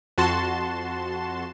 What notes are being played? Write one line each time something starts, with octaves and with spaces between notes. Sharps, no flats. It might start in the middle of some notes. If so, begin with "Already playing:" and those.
F2 F#4 A5 C6 E7